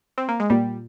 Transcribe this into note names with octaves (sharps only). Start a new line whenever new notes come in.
C4
A#3
G#3
A#2 G3